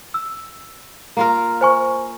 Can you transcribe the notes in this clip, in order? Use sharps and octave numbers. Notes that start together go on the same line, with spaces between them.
E6
A#3 F4 A#4
C5 G#5 C#6